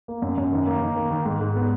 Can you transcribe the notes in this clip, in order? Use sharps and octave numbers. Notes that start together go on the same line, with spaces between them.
A#3
F#2
F#2
D#3
A#3
D#3
A#3
D#3
G#2
G#2
B3